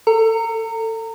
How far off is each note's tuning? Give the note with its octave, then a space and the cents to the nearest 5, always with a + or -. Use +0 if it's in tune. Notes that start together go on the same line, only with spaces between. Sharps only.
A4 +20 A#5 -25